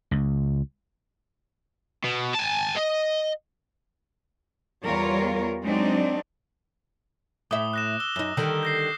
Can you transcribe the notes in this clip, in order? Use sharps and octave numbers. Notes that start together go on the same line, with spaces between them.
C#2
B2
G#5 A5
D#5
E2 G3 F4 A#4 C#5
F#3 G#3 C4 D4 D#4
A2 E5 D6 D#6 G7
F#6 A#6 E7
E6 G7
F#2 D#4
D3 D#3 G3
G6 A#6 C7